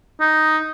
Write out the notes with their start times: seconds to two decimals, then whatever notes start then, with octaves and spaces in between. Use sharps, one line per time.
0.21 D#4